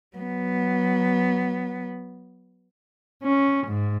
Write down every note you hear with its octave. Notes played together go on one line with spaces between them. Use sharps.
F#3 B3
C#4
G#2